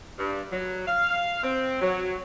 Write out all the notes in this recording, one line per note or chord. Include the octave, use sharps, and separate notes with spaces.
G2
F#3
F5
C4
F#3